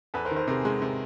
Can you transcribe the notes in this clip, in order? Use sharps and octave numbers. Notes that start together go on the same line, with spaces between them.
E2 A4 B4
A#4 C5
D#3
A#4 C5
C3 G#4 A#4
G#3
C3